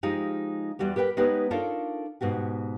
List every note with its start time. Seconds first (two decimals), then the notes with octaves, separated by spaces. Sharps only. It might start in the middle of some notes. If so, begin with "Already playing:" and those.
0.03 F3 G#3 D#4 F4 G4
0.79 E2 G3 F#4 G4
0.96 G4 A#4 B4 F5 G5
1.17 G#3 B3 D#4 G4 B4 C#5
1.51 D4 D#4 F4 A4 A#4 C#5
2.21 G#2 B2 F#4 G4